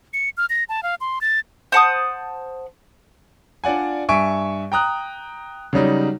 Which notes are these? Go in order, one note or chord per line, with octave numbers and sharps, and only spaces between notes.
C#7
F6
A#6
A5
F5
C6
A6
C5 F#5 A5 D#6
D4 F4 D5 F#5 G#5
G2 E5 G#5 C#6 D7
G5 A#5 D#6 F#6
C#3 F#3 G3 D#4